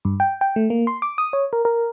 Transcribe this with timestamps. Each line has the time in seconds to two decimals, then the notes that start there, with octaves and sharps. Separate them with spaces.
0.05 G2
0.20 G5
0.41 G5
0.56 A3
0.70 A#3
0.87 C6
1.02 D6
1.18 D#6
1.33 C#5
1.53 A#4
1.65 A#4